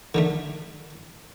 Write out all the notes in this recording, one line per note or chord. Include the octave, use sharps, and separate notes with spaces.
D3 D#3 A3